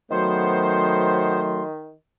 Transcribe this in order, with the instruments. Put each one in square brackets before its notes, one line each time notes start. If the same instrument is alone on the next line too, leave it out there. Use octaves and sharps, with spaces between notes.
[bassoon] D#3 [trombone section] F#3 A3 [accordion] B3 C5 [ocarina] C6